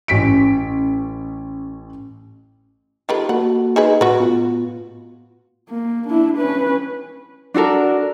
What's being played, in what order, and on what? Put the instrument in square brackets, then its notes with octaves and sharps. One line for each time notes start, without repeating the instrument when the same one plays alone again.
[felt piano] A1 C#4 B6 D7
[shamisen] D#3 F3 B4 [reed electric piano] G4 A4
[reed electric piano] A#3 F#4 A4 [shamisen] F#5
[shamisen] D#4 G#4 B4
[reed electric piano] A2 [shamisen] F#4 B4
[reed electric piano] A2 B3 F4
[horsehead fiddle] A#3
D4 E4
C#4 B4
[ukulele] D4 F#4 A4 A#4